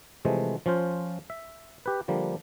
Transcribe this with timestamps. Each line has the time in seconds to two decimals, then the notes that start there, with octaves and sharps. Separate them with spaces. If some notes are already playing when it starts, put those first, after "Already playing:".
0.25 C3 E3 F3 G#3 A3
0.66 F3 C#4 F4 C5
1.30 E5
1.86 G4 B4
2.08 D3 F3 G3 A#3